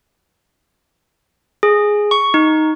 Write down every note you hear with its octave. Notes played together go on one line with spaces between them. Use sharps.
G#4
C#6
D#4